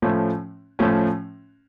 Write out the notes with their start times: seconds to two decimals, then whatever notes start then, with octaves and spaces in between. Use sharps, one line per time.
0.02 A2 F3 A3 C#4
0.79 A2 F3 A3 C#4